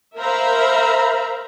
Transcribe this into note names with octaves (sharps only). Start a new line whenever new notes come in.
A#4 C5 E5 F5 A#5 B5